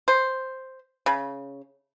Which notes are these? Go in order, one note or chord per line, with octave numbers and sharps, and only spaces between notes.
C5
C#3